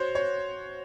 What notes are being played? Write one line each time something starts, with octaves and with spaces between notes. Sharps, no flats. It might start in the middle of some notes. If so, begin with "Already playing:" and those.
Already playing: F#4 C5 C#5
C#5